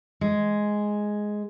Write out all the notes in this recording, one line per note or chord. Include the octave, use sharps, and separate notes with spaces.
G#3